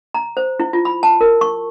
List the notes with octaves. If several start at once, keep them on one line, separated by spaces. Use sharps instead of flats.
A#5
C5
E4
F4
B5
A5
A#4
C#6